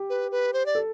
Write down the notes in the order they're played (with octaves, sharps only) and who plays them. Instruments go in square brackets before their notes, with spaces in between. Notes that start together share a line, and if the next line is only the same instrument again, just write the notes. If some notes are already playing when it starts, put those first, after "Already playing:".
Already playing: [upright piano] G4
[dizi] B4
B4
C5
D5
[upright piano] A4